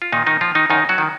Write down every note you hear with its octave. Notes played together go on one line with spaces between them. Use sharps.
F4
A#2 D#3 D#4
D#3 D#4
F3 F4
D#3 D#4
F#2 D#3 D#4
F#3 F#4
D#3